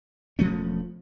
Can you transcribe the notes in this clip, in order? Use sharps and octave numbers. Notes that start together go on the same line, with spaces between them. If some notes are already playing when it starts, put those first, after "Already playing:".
E1 F3 A3 C#4